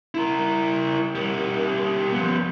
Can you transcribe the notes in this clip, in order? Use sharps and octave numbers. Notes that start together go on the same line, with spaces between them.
E4 A#4
G3 A#4
F3 B3